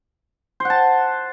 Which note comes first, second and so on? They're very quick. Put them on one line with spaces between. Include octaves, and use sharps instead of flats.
C5 F#5 A5